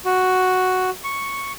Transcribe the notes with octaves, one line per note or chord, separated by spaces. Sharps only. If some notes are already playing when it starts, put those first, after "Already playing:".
F#4
C#6